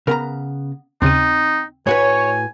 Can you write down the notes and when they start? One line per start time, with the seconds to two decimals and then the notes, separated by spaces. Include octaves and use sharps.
0.07 C#3 B3 A#4 A#5 F6
1.02 D#2 C#3 C4 D#4 D#7
1.87 A2 F#4 B4 C#5 G#5